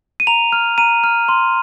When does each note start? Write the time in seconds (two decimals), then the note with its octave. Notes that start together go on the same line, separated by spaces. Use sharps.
0.20 D#7
0.27 A#5 F7
0.52 F6
0.78 A#5 D#7
1.04 F6
1.29 C6